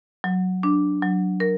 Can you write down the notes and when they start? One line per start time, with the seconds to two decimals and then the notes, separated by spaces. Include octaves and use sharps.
0.24 F#3
0.63 D4
1.02 F#3
1.40 A#4